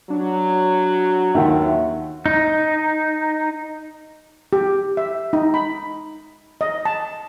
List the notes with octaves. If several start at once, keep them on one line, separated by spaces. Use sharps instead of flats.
F#3 D4
D#2 B2 D#3 F#3 F4 E5 F#5
D#4
G4
E5
D#4
B5
D#5
A5